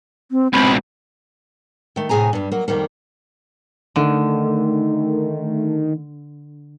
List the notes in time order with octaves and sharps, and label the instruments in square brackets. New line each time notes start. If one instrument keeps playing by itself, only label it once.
[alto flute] C4
[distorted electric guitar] C#2 B2 [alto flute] C4 [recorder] B5
[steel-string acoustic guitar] D#3 A3
A2 C3 G#4 G#5 A#5
G2 G3
F#3 A#3
F2 D#3 G3 A#3
[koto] D3 [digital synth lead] D#3 [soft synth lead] A3